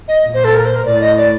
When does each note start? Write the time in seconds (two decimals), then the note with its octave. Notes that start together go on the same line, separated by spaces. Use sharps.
0.08 D#5
0.24 A#2
0.34 C5
0.44 A4
0.55 A#4
0.65 C5
0.76 A#4
0.85 A2 D5
1.01 D#5
1.17 D5